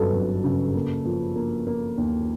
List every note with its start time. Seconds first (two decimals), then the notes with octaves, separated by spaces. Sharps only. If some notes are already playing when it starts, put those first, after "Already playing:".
Already playing: G1 F#2 F#3 A4 B4
0.13 F#2
0.44 C#3
0.75 A#3
1.05 F3
1.36 A#3
1.67 A#3
1.98 D#2